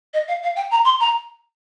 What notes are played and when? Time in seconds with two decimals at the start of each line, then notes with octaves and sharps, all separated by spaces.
0.14 D#5
0.28 F5
0.43 F5
0.56 G5
0.71 A#5
0.85 C6
1.00 A#5